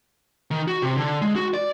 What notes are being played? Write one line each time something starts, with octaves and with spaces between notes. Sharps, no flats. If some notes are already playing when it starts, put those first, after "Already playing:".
D#3
F#4
C3
D3
G#3
F#4
D5